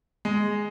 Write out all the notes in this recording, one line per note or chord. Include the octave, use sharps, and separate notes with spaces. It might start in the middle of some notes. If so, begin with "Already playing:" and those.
G#3